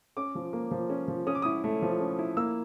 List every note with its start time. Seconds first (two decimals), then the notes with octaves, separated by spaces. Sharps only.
0.17 C#4 D6
0.35 F3
0.53 A#3
0.71 F3
0.90 C#4
1.08 F3
1.27 C#4 D#6
1.35 D6
1.42 E4 D#6
1.64 A3
1.82 F3
2.00 C#4
2.19 E4
2.37 A#3 E6